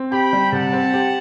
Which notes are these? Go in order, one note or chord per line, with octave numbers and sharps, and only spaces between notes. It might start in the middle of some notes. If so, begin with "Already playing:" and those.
Already playing: C4
G4 G5 B5
G3
C3 F#5 A5
C4
G4